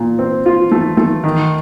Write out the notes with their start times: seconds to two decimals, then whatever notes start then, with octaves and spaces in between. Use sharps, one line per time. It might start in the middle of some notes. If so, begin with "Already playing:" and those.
Already playing: A#2
0.19 C4
0.46 F4
0.72 A3
0.97 A3
1.24 D#3